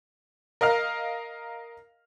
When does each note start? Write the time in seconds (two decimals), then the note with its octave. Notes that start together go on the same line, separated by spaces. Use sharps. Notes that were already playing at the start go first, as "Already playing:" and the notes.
0.61 A#4 D#5 F5 F6